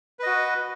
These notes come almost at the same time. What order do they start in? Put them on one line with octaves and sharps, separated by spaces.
B4 D#5 F#4